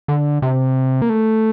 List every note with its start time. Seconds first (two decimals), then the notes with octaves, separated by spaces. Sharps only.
0.08 D3
0.42 C3
1.02 A#3
1.10 A3